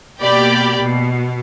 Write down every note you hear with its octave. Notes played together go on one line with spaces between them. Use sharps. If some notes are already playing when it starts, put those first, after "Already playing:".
B2 A#3 G4 D5 G5 B5
B2